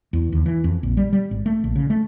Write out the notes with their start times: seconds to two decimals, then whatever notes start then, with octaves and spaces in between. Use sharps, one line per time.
0.13 E2
0.32 D#2
0.46 E3
0.64 F2
0.83 A#1
0.97 G3
1.13 G3
1.31 G#1
1.46 A3
1.64 A#1
1.75 C#3
1.90 A3